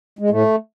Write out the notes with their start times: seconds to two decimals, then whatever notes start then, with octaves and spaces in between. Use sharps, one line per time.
0.19 G#3
0.30 A2 A3